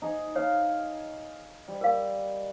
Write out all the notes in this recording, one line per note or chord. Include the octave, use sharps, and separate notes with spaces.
D#4 G#4
C#5 F5
G3
A#4 F5